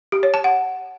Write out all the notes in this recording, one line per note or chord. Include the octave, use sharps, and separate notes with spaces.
G4
C#5
A5
F#5